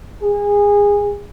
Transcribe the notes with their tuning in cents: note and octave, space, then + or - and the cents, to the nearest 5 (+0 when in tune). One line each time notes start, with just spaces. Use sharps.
G#4 -25